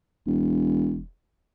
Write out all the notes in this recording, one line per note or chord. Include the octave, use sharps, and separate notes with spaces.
E1